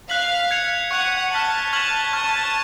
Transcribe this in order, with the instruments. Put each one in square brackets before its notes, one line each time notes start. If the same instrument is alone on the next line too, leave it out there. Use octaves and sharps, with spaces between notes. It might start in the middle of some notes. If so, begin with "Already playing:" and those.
[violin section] F5 [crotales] F#6 B6 F#7
[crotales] G#6 C#7 F7
[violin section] F#5 [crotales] C#6 F#6 C#7 F7
[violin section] A5 [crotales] F6 B6 F#7
[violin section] A5 [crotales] C#6 F6 G#6 B6 F#7
[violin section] A5 [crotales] C#6 F6 G#6